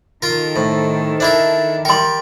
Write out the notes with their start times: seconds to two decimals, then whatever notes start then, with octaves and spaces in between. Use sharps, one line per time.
0.22 D#3 F4 A4 A#4
0.56 A2 C5
1.20 D4 E4 A#4 E5
1.85 G3 A#4 G5 C6